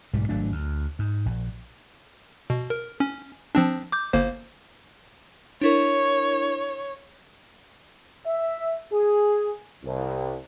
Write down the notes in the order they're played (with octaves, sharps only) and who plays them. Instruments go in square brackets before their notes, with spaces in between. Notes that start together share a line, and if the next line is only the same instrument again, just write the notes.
[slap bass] B1 G#2 G3
G#1 F#3 A3 D4
D2
G#2
A#1
[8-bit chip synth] B2
A#4
C#4
F3 C4 D4
D6 G6
G1 A#3 C5
[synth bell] D4 E4 A#4 [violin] C#5
[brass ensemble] E5
G#4
C2